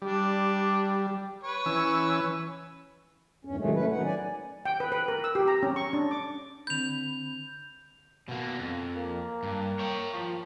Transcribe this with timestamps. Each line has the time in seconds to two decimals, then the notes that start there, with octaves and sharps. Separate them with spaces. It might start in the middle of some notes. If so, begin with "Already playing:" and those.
0.02 G3 D4
1.43 B4 C#5
1.66 E3 C#4 E6
3.45 E2 G2 C#4
3.58 A2 C3 D#3 F#3 G#3 A3
3.75 A3 C#4 B4
3.91 D#3 F#3 D#4 F#5
4.05 D5 G#5
4.65 G5
4.80 B4
4.92 B4
5.08 A#4
5.24 E6
5.35 G4
5.48 A#5
5.63 C#4
5.76 C#6
5.93 D4
6.11 D6
6.67 D3 C4 B5 G6 F7
8.28 B2 A#3
8.59 F2
8.96 A#3
9.43 G2
9.79 C#5 G5
10.14 F3